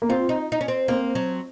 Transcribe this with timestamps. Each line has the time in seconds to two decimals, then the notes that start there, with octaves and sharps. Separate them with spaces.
0.02 A#3
0.09 C4 F4
0.29 D#4
0.52 D#4
0.61 C#4
0.68 C4
0.88 A#3 C4
1.15 F#3